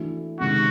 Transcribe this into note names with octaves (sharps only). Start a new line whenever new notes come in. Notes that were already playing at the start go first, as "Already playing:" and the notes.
Already playing: E3 A3 D4 F#4
C3 D#3 G#3 F#4